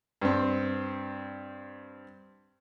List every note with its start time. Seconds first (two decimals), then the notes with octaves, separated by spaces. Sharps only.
0.22 G2 C4